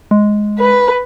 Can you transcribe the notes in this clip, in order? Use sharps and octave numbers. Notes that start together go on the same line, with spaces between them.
G#3
B4